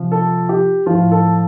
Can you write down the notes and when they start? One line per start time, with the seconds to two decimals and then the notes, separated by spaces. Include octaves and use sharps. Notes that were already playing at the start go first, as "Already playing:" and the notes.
Already playing: C3 F3
0.12 A4
0.49 G4
0.86 A2 F3 F4
1.12 A4